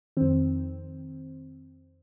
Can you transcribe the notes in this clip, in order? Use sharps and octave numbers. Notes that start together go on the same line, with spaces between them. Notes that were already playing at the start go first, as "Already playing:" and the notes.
F2 D#3 C4